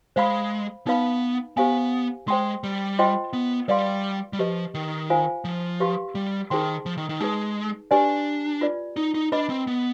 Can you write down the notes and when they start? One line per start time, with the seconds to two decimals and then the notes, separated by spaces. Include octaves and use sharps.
0.16 G#3 C5 F5 B5
0.87 B3 D#4 B4 F5 B5
1.57 B3 G4 C5 F5 G#5
2.28 G#3 C5 G5 C6
2.64 G3
2.99 F4 C5 D#5 G5 C6
3.33 B3
3.68 G3 B4 D5 F5 C6
4.33 G3
4.39 F3 G4 B4 D#5
4.75 D#3
5.10 F4 C5 F5 G#5
5.45 F3
5.80 G4 B4 F5 C6
6.15 G3
6.50 D#3 D#4 G#4 C5 G5 C6
6.86 F3
6.98 D#3
7.09 D#3
7.20 G#3 D#4 G#4 B4
7.91 D4 G4 B4 D5 G#5
8.61 F4 B4 D5
8.97 D#4
9.14 D#4
9.32 D4 B4 D#5 B5
9.50 C4
9.67 B3